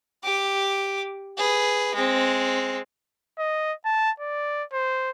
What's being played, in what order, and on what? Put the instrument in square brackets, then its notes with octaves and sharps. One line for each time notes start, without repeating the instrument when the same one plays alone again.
[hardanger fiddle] G4 D6
G#4 B4
G#3 C4
[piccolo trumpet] D#5
A5
D5
C5